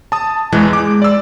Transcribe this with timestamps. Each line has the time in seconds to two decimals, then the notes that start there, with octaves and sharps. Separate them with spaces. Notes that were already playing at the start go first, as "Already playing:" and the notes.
0.12 A5 D#6
0.53 E2 E3 G#3
0.73 D6
1.02 D5 E6